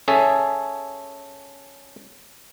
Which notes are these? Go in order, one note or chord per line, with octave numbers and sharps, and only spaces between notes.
C#4 G#4 A4 E5